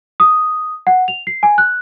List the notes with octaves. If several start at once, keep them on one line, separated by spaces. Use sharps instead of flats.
D#6
F#5
F7
C7
G#5
F#6